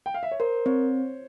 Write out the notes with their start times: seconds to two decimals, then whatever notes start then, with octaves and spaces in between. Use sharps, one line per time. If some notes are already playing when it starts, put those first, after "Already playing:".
0.06 G5
0.14 F5
0.23 E5
0.31 C#5
0.40 A#4 C5
0.66 C4 C#5